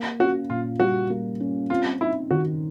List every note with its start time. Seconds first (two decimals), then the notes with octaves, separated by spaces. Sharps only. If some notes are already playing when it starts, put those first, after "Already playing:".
Already playing: A#3
0.19 C#4 F#4
0.49 A#2 F4
0.80 G3 F#4
1.10 A#3
1.40 C#4
1.70 C4 F4
2.01 D#4 E4
2.31 D#3 F#4